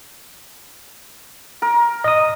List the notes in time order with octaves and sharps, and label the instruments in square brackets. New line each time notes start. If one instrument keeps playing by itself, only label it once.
[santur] A#4
[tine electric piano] D#5 D#6